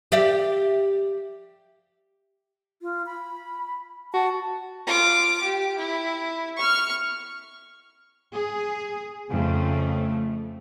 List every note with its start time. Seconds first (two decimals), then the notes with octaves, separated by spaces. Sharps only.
0.12 G4 D5 E5
2.82 F4
3.06 B5
4.14 F#4 A5
4.87 F4 D6
5.43 G4
5.78 E4
6.57 C#6 F6
8.34 G#4
9.29 F2 C#3 A3